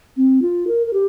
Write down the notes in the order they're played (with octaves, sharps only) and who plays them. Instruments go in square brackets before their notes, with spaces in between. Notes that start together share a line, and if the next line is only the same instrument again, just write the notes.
[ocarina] C4
F4
A#4
A#4
G4